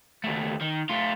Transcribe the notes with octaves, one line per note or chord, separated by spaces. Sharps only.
D#2 A3
D#3
A3 F4